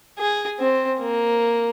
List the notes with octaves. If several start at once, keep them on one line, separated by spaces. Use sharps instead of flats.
G#4
C4
A#3